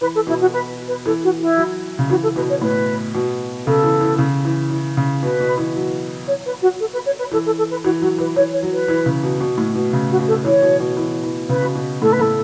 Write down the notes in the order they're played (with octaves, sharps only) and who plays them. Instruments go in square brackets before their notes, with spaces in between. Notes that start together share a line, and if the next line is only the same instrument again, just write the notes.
[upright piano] E3 [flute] B4
[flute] A4
[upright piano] B2 [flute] E4
[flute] F#4
B4
B4
[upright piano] E3 [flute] A4
[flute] F#4
E4
[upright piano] F#3
C#3
[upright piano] E3 [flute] F#4
[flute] A4
[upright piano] B2 [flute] B4
[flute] C#5
[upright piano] A2 [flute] B4
[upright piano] B2
[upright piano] C#3 [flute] A4
[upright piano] E3
E3
C#3
E3
E3
C#3
[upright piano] B2 [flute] B4
[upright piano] B2
E3
F#3
[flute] C#5
B4
F#4
A4
B4
C#5
B4
[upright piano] E3 [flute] A4
[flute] A4
A4
B4
[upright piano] E3 [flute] F#4
[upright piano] F#3 [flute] F#4
[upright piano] E3 [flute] B4
[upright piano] E3 [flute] C#5
[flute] C#5
[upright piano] F#3
[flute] B4
[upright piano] E3
C#3
B2
B2
A2
B2
C#3
[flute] F#4
[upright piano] B2
[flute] A4
[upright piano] E3 [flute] C#5
[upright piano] B2
B2
E3
E3
[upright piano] C#3 [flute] B4
[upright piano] B2
B2
[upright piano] A2 [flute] A4
[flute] B4
[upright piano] A2 [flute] A4